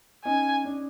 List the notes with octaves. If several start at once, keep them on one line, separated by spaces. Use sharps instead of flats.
C#4 D#4 G#5
D4